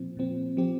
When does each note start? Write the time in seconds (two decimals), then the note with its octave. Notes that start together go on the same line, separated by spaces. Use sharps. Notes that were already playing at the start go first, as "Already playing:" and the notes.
Already playing: A#2 F3 C4
0.17 A#2 F3 C4
0.57 F3 C4 G4